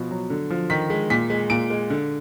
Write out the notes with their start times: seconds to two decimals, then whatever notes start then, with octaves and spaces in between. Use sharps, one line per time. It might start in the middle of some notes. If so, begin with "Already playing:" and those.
Already playing: B2 F3
0.11 F#3
0.30 D3
0.50 F3
0.70 D#3 B6
0.90 G#3
1.10 A#2 B6
1.30 G#3
1.50 A#2 D7
1.70 G#3
1.90 D3